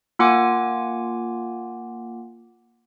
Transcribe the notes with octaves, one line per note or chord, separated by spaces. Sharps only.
A#3 F4 F#5 G#5 D6